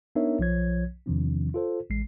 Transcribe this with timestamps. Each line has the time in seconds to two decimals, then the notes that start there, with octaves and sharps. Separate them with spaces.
0.15 B3 D4 D#4 A#4 C#5 E5
0.39 B1 F3 C#5 G#6
1.06 E2 C3 D#3 F3 C4 D4
1.54 F4 A4 C5
1.90 A1 G#3 C7